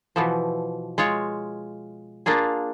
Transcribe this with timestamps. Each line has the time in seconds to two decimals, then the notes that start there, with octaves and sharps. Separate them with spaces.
0.16 B2 E3 F3
0.98 G#3 F4 C#5
2.26 A#3 D4 F4 G#4